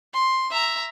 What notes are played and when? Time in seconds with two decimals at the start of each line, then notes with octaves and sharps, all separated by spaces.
0.14 C6
0.51 E5 A#5